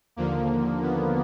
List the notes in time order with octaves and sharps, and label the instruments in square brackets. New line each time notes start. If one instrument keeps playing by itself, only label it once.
[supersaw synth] D#2 D3 F3 A#3
B3